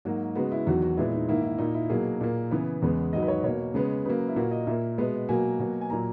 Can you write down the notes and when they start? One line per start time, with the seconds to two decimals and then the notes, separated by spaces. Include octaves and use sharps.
0.05 G#2 F#3 A#3 F#4
0.35 C#3 G#3 B3 F#4
0.52 E4
0.67 E2 D#3 F#3 F#4
0.82 F#4
0.97 A#2 G#3 B3 E4
1.13 D#4
1.29 G#2 D#3 A#3 E4
1.43 E4
1.58 A#2 A#3 D#4
1.74 E4
1.90 B2 F#3 A#3 G#4
2.21 A#2 A#3
2.51 C#3 E3 B3
2.82 E2 C#3 G#3 B3
3.13 G#2 D#3 F#3 D#5
3.22 B4
3.28 C#5
3.44 B2 A#3 C#5
3.74 C#3 G#3 B3
4.05 C#3 F#3 A#3 B4
4.28 E4
4.36 A#2 A#3 F#4
4.51 D#5
4.67 A#2 A#3 E5
4.98 B2 G#3 B3
5.29 B2 F#3 A#3 G#5
5.59 B2 F#3 A#3
5.81 G#5
5.90 A#2 F#3 A#3 A#5